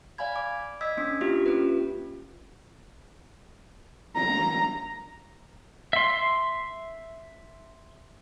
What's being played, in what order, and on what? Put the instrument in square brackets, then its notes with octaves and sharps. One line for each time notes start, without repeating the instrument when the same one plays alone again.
[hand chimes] D5 F5 G#5 B5 G#6
D6
D#5 D#6 E6 G#6 B6
A#3 C#4 D4 D#6
A#3 E4 F4 G4 E5
C#4 F4 G4 B4
[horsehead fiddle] A#5
[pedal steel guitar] E5 C6